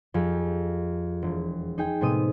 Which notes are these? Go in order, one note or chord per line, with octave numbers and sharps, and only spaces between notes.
F2 F3 G4 G#4
E1
D#4 G#4 G5
A2 C3 G#3 B3 D#5 D#6